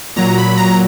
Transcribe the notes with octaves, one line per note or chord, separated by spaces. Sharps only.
A#2 F#3 A#5
B5
A#5